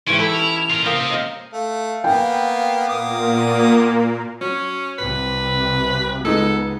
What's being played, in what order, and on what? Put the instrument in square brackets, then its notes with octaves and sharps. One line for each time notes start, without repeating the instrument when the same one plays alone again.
[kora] G#2 E3 G4 [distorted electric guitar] C#4 [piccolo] D7
[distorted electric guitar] E4 [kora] A4 [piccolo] B5
[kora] C#4 [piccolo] F7
[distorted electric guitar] F4 A#4
[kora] A#3 G5 [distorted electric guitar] C4 G4 [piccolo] D#6
[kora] D#5 F5
[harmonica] A3 [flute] F5
[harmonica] A#3 B3 [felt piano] G5
[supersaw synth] A#2 A#3 [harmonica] B3 D6 D#6
[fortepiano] F#3 [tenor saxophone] C#4
[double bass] C2 C3 [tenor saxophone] B4
[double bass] C#2 B3 [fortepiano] G#3 D#4 [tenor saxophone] A4